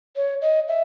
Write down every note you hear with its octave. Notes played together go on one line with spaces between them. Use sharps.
C#5
D#5
E5